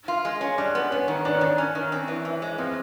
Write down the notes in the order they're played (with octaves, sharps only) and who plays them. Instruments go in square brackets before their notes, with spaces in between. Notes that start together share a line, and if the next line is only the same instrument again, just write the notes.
[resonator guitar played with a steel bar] F4
G#3
C#4
[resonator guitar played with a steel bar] G3 [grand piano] D4
[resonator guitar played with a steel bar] B3
[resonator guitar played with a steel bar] B3 [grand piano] C#4
[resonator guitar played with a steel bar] D#3
[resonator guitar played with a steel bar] D#3 [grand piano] D4
[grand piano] C#4
[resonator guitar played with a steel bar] D#3 [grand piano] D4
[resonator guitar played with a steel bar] C#4
D#3
C4
E3
E3
G#3
[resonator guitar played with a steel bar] F3 [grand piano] C4